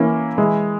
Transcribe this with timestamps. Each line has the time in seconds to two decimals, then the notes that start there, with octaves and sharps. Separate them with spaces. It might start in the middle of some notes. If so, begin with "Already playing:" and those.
Already playing: E3 A#3 C#4 E4
0.38 E3 G#3 E4